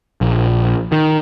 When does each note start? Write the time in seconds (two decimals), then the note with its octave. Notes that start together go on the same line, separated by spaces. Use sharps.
0.21 A#1
0.92 D#3